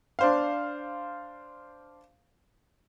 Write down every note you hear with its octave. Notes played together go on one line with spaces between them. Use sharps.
D4 C5 F5